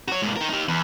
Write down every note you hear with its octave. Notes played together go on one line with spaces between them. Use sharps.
F#4 C#5
G#2 A#3
D#4 A#4
D#4 G4
E2